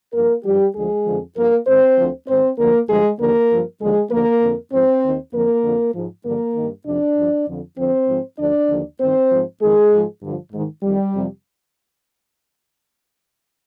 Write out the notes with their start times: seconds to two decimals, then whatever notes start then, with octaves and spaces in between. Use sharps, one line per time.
0.14 G2 F3 A#3 A#4
0.44 G2 F3 G3 G4
0.75 D2 D3 F3 G#3 G#4
1.05 F2 D3 F3
1.36 G2 F3 A#3 A#4
1.66 G#2 D#3 C4 C5
1.97 D2 D3 F3
2.28 G#2 D#3 C4 C5
2.58 D2 D3 F3 A#3 A#4
2.88 G2 D3 F3 G#3 G#4
3.19 D#2 D3 F3 A#3 A#4
3.50 G2 F3
3.80 D#2 D3 F3 G#3 G#4
4.11 D#2 D3 F3 A#3 A#4
4.42 F2 D3 F3
4.72 G#2 F3 C4 C5
5.03 D#2 D#3
5.33 F2 D3 F3 A#3 A#4
5.64 F2 D3 F3
5.94 G#2 F3
6.24 G2 D3 F3 A#3 A#4
6.55 G2 D#3
6.85 F2 C3 F3 D4 D5
7.16 G2 F3
7.47 F2 D3 F3
7.77 F2 D3 F3 C4 C5
8.07 G#2 F3
8.38 D2 D3 F3 D4 D5
8.69 D#2 D3 F3
9.00 G2 D#3 C4 C5
9.31 G#2 F3
9.60 F2 D#3 G#3 G#4
9.92 G#2 F3
10.22 G2 D3 F3
10.52 G#2 D#3
10.83 F2 D#3 G3
11.14 F2 C3 F3